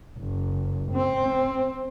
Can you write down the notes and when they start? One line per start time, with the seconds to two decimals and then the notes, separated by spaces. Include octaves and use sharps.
0.19 F#1
0.92 C4